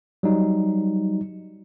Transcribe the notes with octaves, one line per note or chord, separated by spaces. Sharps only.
F#3 G3 D#4